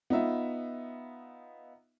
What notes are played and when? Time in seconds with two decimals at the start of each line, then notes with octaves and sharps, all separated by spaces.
0.10 B3 D#4 F4 E5